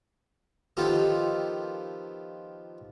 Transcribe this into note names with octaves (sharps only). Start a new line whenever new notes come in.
D#3 F3 B3 F4 G4 A4